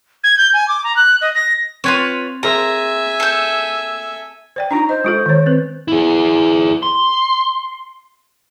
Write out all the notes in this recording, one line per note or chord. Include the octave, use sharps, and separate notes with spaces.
G#6
G6
G#5
D6
A#5
F#6
D#5
A#6
C4 F4 B4 C#5 G#6 D#7
G#4 A#4 C5 E5 G#5 A#5
A4 G6
C5 D5 G5
D4 D#4 F4 A#5
C5 D#5
G#3 F4 A4
D#3 C#5
C4 B4
E4 G#4
C6